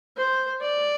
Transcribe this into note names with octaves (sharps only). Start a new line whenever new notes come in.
C5
D5